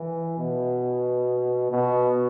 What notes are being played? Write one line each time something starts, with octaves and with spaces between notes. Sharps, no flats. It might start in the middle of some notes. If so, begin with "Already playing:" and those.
Already playing: E3
B2
B2